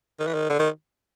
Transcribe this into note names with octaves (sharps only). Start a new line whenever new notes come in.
D#3
E3
D#3
D3
D#3